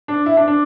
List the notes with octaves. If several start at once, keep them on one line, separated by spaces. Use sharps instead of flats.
D4
E4
D4
D4